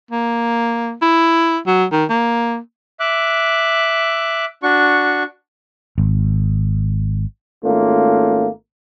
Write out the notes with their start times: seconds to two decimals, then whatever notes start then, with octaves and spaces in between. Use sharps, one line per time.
0.11 A#3
1.02 E4
1.67 F#3
1.92 D#3
2.10 A#3
3.00 E5 D6 F#6
4.63 D4 F#4 C#6
5.98 G#1
7.65 G#1 A3 A#3 C#4 F4